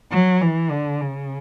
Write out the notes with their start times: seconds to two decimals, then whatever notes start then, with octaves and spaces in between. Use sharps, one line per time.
0.11 F#3
0.41 E3
0.70 D3
1.01 C#3